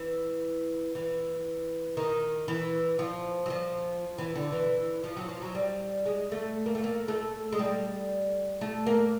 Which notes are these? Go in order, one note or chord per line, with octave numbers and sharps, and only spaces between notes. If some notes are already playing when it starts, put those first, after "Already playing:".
Already playing: E3
E3
D#3
E3
F3
F#3
F3
E3
D3
E3
F3
F#3
F3
F#3
G3
G#3
A3
A#3
A3
A#3
A3
G#3
G3
A3
A#3